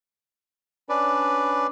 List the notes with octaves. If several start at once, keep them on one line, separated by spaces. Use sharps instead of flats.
C#4 D4 B4 D5